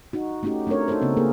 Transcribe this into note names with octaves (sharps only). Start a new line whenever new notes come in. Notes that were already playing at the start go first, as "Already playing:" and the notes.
D#4 F#4
A3 C#4 D#4 F#4 G4
A3 C4 D4 A#4 C#5
D#4 F#4 A4 C5
C#3 B3 C4
A#3 G#4 A#4